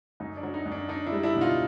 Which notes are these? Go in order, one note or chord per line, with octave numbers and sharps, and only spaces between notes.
F#2 D#4
D4
F#3
D#4
F#2
D4
D4 D#4
D4 E4
G3
D4 E4
B2
D#4 F4